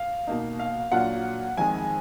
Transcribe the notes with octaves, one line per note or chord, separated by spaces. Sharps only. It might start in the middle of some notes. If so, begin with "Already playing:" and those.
Already playing: F5
B2 A#3 D#4
F5
A#2 F#3 D4 F4 F#5
F2 D#3 G#3 G#5